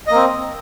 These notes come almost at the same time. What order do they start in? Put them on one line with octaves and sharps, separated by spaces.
D#5 A#3 C4